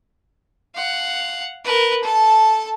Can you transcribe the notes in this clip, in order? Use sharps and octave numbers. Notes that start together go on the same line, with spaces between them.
F5 F#5
A#4 B4
A4 A5